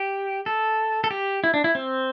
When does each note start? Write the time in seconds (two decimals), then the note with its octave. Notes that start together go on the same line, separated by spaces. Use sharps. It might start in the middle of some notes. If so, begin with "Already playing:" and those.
Already playing: G4
0.46 A4
1.04 A4
1.11 G4
1.44 E4
1.54 D4
1.64 E4
1.75 C4